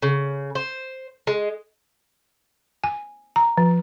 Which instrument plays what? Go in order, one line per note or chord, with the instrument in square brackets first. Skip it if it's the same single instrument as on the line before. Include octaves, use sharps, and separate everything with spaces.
[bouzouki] C#3
C5
G#3
[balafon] G#5
A#5
F3